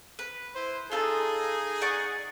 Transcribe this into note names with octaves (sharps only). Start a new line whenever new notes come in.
B4
E4 C5
D#4 F4 G#4 A4
D5 F#5 C#6